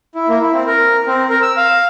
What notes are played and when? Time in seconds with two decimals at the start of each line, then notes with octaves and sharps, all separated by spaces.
0.15 E4
0.28 A#3
0.41 E4
0.53 C4
0.67 A#4
1.07 C4
1.30 A#4
1.42 E6
1.57 F5